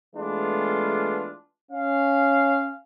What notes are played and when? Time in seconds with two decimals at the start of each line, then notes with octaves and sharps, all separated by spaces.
0.15 E3 G#3 A3 B3 D4 F4
1.72 C#4 F5